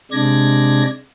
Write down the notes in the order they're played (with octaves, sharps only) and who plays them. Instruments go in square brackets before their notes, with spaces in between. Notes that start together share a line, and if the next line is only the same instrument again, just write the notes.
[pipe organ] C3 G#3 D4 D5 G#6 A#6